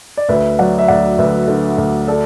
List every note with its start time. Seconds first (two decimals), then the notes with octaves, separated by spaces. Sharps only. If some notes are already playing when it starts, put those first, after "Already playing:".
0.17 D5
0.29 D2 B4 E5
0.59 F#3 D5 F#5
0.79 E5
0.88 D2 D5 F#5
1.18 D2 B4 E5
1.48 D3
1.78 D2
2.08 A4 D5